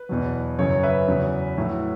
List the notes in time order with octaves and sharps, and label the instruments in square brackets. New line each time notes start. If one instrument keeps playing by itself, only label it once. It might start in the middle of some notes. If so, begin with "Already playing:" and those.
Already playing: [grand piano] B4
E2 B2 F#3
F#2 C#3 F#3 C#5
B4 E5
E2 C#3 F#3
A2 F#3